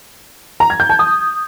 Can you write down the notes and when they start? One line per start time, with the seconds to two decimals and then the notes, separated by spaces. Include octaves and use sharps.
0.60 A#5
0.70 G#6
0.80 G6
0.89 A5
0.99 D#6